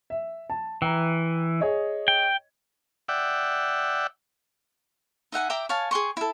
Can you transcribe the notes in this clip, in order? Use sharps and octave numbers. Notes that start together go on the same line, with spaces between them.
E5
A5
E3 G5 A#5
G#4 C#5 D#5
G5
D5 E5 F#5 G5
D#4 E5 F#5 G#5
E5 G5 A#5 D6
C#5 F5 G#5 A5
G#4 G5 C6 C#6
E4 A4